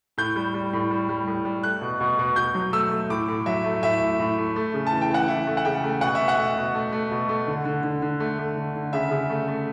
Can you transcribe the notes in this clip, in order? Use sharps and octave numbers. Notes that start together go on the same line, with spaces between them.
A2 G6
G3
G3
A2
G3
G3
A2
G3
A3 F#6
B2
B2
B2
B2 G6
F#3
A3 E6
A3
A2 D6
A2
F#3 E5
A3
A2 E5
A2
A2
A3
A3
C#3
A5
E3
G5
E3 F#5
E3 E5
A3
F#5
C#3 G5
A3
B2 F#5
E5
B2
F#5
A3
B2
A3
A3
B2
A3
D3
D3
D3
D3
A3
A3
D3
D3
C#3 E5
C#3
A3
A3